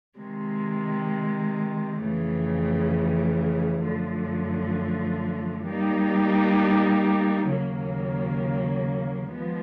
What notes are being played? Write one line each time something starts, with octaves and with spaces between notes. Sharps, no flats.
C3 D#3 G#3
F2 C#3 E3 A3
F#2 D3 F3 A3
G3 A#3 D#4
D#2 C#3 F#3 A#3
F3 G#3 B3